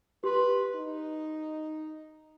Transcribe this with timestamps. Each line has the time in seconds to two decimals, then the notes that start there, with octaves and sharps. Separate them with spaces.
0.24 G4 B4 C6
0.75 D#4